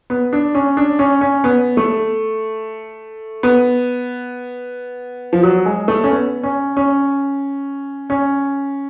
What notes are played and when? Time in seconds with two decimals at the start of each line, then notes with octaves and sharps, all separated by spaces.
0.10 B3
0.33 D4
0.55 C#4
0.77 D4
0.99 C#4
1.21 C#4
1.44 B3
1.77 A3
3.43 B3
5.33 F3
5.43 F#3
5.66 G#3
5.88 A3
6.04 C#4
6.10 B3
6.43 C#4
6.77 C#4
8.10 C#4